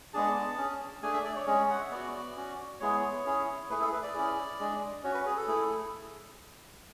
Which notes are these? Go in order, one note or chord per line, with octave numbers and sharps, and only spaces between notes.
G#3 B3 D4 G#4 A5
C#4 G#4
A3 D4 G#4 G#5
E5
D5
C#5
G#3 C#4 G#4
F#5
E5
B3 F#4 D5
C#4 F#4
G#3 B3 E4 G#4 C#5
C#4 E4 G#4
A3 E4 G#4 B4
A4
B4
D5
C#4 E4 G#4
G#3 D4 G#4
C#4 F#4 C#5
B4
G#4
A4
A3 E4 G#4